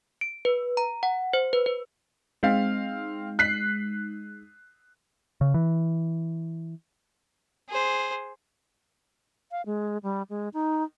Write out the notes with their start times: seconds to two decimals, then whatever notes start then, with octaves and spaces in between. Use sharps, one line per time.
0.21 D7
0.45 B4
0.77 A#5
1.03 F#5
1.33 C5
1.53 B4
1.66 B4
2.43 G#3 C4 D#4 F5
3.39 F#6 B6 C7
5.41 C#3
5.54 E3
7.68 G#4 C5
9.51 F5
9.66 G#3
10.03 G3
10.30 G#3
10.54 D#4